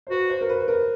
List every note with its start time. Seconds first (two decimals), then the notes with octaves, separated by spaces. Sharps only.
0.07 C5
0.10 F#4 B4
0.30 C5
0.41 A#4
0.49 B4
0.60 B4
0.68 A#4